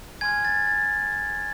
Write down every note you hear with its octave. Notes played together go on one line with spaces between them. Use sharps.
G#5 C6 F6 G#6
A6
A6